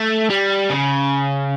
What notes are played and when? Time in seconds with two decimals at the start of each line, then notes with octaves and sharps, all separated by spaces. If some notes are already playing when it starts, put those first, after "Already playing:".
Already playing: A3
0.30 G3
0.70 C#3